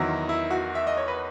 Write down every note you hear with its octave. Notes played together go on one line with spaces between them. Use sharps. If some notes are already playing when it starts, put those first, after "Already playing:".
Already playing: E2 D#3 F#3 E4
E4
F#4
E5
D#5
C#5
B4